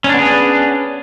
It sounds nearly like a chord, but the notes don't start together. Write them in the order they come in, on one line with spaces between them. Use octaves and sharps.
C#4 D4 B3 G#4